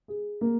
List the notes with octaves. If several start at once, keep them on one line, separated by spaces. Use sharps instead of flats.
G#4
A#3